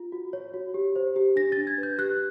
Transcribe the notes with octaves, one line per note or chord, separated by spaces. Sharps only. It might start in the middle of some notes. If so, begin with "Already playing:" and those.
Already playing: F4
F#4
C#5
F#4
G4
C5
G4
D4 A#6
A6
D4
G#6
B4
G6
G4 F#6